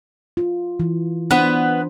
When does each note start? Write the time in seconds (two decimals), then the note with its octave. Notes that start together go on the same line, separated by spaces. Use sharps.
0.37 F4
0.80 E3
1.31 B3 D4 B4 C5